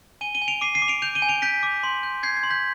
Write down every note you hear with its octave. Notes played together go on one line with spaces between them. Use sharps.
G#5 D#7 G7
D#7 G7
G#5
D7 F7
D6 C7 D#7
C7 D#7
D6
D7 F7
G6 D7 F7
D#7 G7
G#5
D7 F7
G6 B6 D7
D6
C6
G6
G6 G#6 C7
G#6
C6
G6 B6